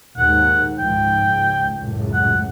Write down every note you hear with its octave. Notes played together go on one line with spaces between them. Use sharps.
D#2 G#2 F#5
C#2 G#2 F3 G5
C#2
C#2 F#2 A2
F#5